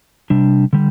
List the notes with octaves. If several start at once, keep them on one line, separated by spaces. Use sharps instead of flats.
C3 G3 D4
D3 G3